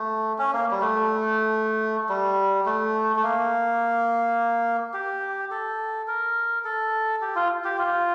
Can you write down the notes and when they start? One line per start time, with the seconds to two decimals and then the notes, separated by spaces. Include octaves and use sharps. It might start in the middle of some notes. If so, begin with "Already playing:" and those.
Already playing: A3
0.38 C#4
0.53 A#3
0.71 G3
0.81 A3
2.09 G3
2.66 A3
3.16 A3
3.23 A#3
4.94 G4
5.51 A4
6.08 A#4
6.64 A4
7.21 G4
7.35 F4
7.64 G4
7.78 F4